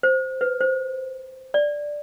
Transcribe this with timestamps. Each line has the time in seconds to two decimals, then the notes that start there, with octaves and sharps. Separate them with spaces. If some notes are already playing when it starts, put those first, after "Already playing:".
0.03 C5
0.41 B4
0.61 C5
1.54 D5